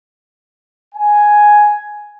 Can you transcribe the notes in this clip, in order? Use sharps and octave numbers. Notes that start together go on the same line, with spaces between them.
G#5